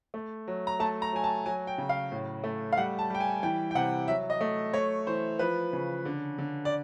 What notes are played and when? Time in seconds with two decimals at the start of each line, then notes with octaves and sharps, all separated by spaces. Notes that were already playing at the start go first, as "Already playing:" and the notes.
0.14 A3
0.48 F#3
0.67 A#5
0.80 A3 A5
1.02 A#5
1.13 F#3 G#5
1.24 A5
1.46 F#3 G#5
1.67 G5
1.78 C#3
1.89 F5
2.12 A2
2.44 A3
2.72 F5
2.77 G3 F#5
2.99 A5
3.10 G3 G5
3.20 G#5
3.43 E3 G5
3.71 G5
3.75 C3 F#5
4.08 F#3 E5
4.30 D#5
4.41 A3
4.73 A3 C#5
5.07 E3 C5
5.39 F3 B4
5.73 C#3
6.05 D3
6.38 D3
6.65 D5